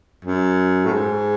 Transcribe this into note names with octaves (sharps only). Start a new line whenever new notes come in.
F#2
A2
G#2